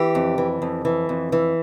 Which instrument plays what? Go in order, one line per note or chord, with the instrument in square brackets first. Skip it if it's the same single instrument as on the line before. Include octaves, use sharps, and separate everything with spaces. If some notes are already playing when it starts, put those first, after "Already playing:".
Already playing: [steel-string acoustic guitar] E3 G4
F2
E3
F2
E3
F2
E3